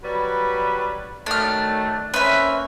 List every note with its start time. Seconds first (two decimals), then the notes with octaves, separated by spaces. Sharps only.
0.03 F#3 G3 B4
1.26 D#3 F#3 A3 D4 F6
2.14 A#3 C4 C#4 B4 E5